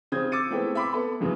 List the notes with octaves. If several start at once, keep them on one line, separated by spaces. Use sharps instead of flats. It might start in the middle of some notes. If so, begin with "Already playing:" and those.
C#3 C4 D#6 G6 G#6
D6 E6 A6 C#7 D#7
A3 B3 C4 E4 G#4 G5
E5 G5 B5 C6 D6
B3 A4 B5
F#2 A2 C#3 E3